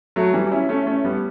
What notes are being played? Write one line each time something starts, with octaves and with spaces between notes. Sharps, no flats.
F#3 A3
E3 G3
C#4 E4
A3 C#4
A3 C#4
G3 B3